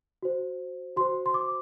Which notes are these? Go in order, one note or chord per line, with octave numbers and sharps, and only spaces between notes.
F#4 C5
F#4 C5 C6
C6
D6